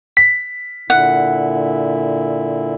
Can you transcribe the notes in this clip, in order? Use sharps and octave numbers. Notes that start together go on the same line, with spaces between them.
B6
A#2 D3 E4 F#5